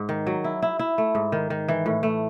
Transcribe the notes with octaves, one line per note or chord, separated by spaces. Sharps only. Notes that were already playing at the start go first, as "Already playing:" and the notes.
Already playing: G#2
D#3
F#3
E4
E4
E4
A3
G#2
D#3
D#3
E3
A2
A3